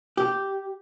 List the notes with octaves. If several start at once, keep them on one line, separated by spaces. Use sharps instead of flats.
G4